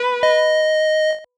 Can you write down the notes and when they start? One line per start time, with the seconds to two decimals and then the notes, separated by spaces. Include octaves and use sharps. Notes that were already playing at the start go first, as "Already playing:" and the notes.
Already playing: B4
0.23 D#5